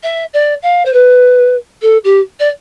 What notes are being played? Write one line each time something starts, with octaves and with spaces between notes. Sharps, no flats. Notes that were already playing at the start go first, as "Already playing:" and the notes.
E5
D5
F5
C5
B4
A4
G4
D5